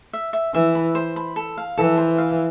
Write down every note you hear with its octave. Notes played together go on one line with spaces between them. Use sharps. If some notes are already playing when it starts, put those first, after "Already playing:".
E5
E5
E3 E5
B5
C5
B5
A4
F5
E3 A4
C5
F5